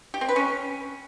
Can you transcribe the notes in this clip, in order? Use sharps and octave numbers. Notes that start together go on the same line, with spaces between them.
G4
C4
B4
C#4